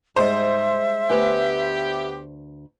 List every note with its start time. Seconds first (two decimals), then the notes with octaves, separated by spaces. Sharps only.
0.16 G#2 G3 G#3 C5 D#5 E5
1.10 D2 B3 G4 B4 G#5